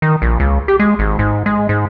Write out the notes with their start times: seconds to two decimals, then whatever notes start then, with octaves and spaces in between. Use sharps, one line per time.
0.02 D#3
0.22 A#1
0.40 C#2
0.68 G4
0.80 G#3
0.99 G#1
1.19 G#2
1.46 G#3
1.69 G#2